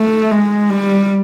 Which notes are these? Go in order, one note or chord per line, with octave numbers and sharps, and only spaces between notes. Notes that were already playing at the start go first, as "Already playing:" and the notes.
Already playing: A3
G#3
G3